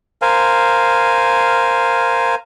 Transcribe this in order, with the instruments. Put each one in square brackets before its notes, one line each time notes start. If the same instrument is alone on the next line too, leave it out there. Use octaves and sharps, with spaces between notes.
[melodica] A#4 C5 F5 G#5